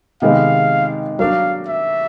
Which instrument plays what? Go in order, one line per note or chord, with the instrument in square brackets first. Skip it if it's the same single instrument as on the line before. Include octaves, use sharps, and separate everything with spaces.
[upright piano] C3 D#3 G#3 B3 D#4 [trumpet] F5
[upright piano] F#3 A#3 D4 [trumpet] F5
[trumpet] E5